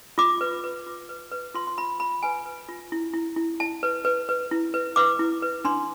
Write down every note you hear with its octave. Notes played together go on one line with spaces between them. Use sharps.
F4 D6
B4
B4
F4
B4
B4
F4 C6
C6
F4 B5
F4 B5
B4 G#5
B4
F4
E4
E4
E4
E4 A5
B4
B4
B4
E4
B4
B4 D6
E4
B4
D4 C6